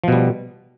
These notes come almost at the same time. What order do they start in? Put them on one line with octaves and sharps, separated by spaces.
F3 B2 G3